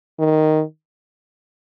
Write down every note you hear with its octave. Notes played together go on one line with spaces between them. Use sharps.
D#3